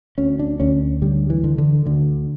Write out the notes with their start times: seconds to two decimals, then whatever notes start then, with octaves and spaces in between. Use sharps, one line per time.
0.18 D2 C#4
0.39 D4
0.60 D2 C#4
1.02 D3 G3
1.30 E3
1.44 D3
1.58 D3
1.86 D2 D3